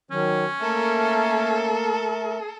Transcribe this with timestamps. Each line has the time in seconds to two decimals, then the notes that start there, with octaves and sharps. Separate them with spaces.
0.11 D#3 F#3 C#4
0.62 A3 A#3 A4 A#4 E5